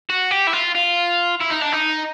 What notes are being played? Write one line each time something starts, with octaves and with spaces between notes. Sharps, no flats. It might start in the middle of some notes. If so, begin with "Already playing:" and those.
F#4
G4
E4
F4
F4
E4
D#4
D4
D#4